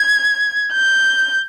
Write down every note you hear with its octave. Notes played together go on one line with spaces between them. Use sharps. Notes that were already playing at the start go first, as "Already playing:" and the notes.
Already playing: G#6
G6